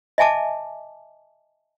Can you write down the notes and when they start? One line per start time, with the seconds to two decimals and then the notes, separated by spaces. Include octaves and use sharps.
0.18 D#5 E5 G#5 A5 D6